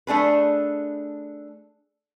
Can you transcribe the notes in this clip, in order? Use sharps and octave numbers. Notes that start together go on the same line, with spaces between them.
A3 D4 G#4 B4